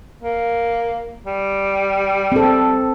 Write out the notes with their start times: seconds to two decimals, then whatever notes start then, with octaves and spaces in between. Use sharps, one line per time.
0.23 A#3
1.25 G3
2.32 C4 A4